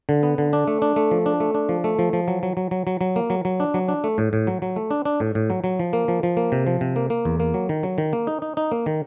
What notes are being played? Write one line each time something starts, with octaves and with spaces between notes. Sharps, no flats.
D3
B3
D3
D4
A3
D4
A3
F3
D4
A3
D4
F3
A3
F3
F3
F#3
F#3
F#3
F#3
F#3
F#3
A#3
F#3
F#3
D4
F#3
D4
A3
A2
A2
F#3
F#3
A3
D4
D4
A2
A2
F#3
F#3
F3
A#3
F3
F3
A#3
C3
F3
C3
A#3
A#3
E2
A#3
F#3
D#3
F#3
D#3
A#3
D#4
D#4
D#4
A#3
D#3